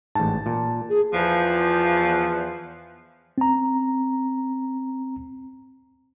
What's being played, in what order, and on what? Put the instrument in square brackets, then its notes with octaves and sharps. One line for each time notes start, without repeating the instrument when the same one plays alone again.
[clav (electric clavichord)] A1 G#2 [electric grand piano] A5
[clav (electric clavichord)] A#2
[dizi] G#4
[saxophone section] E2 F3
[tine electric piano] C4 A#5